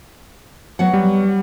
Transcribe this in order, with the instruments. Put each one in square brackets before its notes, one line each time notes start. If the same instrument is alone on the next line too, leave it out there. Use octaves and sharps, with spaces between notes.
[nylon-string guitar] F#3 B3 F#5
[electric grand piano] G3